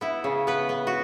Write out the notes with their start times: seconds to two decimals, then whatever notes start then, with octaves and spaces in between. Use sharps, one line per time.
0.01 B3 E4
0.24 C#3
0.47 B3 B4
0.69 B3
0.87 F#4